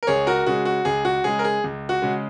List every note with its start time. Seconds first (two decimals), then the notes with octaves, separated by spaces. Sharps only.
0.03 A#4
0.07 C#2 G#4 C#5
0.27 F#4 A#4
0.46 C#3 G#3 F#4
0.65 F#4
0.85 C#2 G#4
1.05 F#4
1.24 C#3 G#3 G#4
1.39 A#4
1.44 G#4
1.64 C#2
1.89 F#4
2.02 C#3 G#3